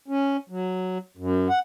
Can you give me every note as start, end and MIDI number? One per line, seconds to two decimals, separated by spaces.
0.08 0.37 61
0.49 0.98 54
1.17 1.48 42
1.49 1.59 78